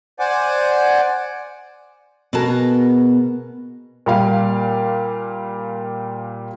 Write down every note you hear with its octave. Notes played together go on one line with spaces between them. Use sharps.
C5 D5 F#5 G#5 D6
B2 B3 F#4 G#4 A#4 A5
A#2 G3 F5